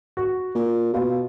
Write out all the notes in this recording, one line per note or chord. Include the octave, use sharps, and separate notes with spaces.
F#4
A#2
B2 F4